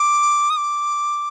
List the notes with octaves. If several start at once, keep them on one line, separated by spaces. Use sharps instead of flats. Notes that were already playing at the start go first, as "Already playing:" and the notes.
Already playing: D6
D#6
D6